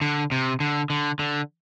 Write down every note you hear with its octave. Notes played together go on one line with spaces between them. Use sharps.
D3
C3
D3
D3
D3